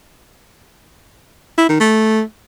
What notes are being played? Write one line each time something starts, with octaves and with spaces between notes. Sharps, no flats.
E4
D#3
A3